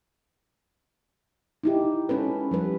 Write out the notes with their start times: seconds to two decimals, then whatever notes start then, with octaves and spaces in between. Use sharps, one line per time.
1.63 D#4 E4 G4
2.09 G#3 C#4 A4 B4
2.51 F3 G3 B4